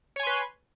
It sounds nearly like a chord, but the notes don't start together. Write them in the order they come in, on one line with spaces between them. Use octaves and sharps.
C#5 G#5 C6 B4